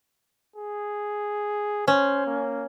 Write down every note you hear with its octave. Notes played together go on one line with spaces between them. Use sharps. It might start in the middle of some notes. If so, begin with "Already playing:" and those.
G#4
C#4 C5
A#3